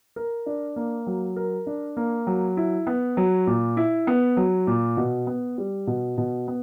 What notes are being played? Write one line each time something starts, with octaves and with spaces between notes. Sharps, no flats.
A#4
D4
A#3
F#3
A#4
D4
A#3
F#3
E4
B3
F#3
A#2
E4
B3
F#3
A#2
B2
B3
G3
B2
B2
B3